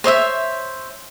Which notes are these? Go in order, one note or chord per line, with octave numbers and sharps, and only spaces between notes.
C5 C#5 D#5 E5